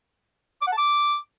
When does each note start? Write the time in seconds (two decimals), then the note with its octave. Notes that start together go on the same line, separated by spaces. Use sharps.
0.62 D6
0.67 F#5
0.72 A5
0.78 D6